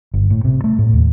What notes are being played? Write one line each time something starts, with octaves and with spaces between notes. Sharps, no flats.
G1
A2
C3
A3
A2
D#2